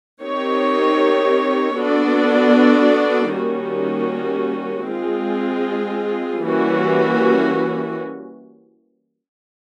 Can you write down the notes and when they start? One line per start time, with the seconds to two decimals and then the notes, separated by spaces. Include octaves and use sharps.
0.23 C4 D#4 G4 A#4 C#5
1.77 B3 D4 F#4 A4 D5
3.32 D#3 G3 A#3 C#4 F#4
4.87 G#3 C4 F4 G#4
6.43 E3 G3 A#3 C#4 F#4